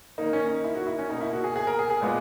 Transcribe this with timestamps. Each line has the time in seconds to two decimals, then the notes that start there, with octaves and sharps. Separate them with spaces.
0.18 D#3 A#3 D#4
0.33 C#4
0.48 D#4
0.64 E4
0.75 F#4
0.87 E4
0.98 C#4
1.09 B2 A#3 D#4
1.21 E4
1.33 F#4
1.44 G#4
1.56 G#4
1.67 A#4
1.79 G#4
1.90 G#4
2.01 A#2 G#3 B3